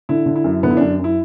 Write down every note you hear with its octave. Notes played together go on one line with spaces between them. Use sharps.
D3 E4
D3
E4
F#2
D3 B3
E4
F#2 D4
F#2 E4